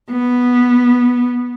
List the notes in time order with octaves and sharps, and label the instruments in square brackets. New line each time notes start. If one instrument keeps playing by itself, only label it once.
[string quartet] B3